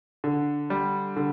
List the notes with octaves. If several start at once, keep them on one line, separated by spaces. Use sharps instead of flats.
D3
G3
D3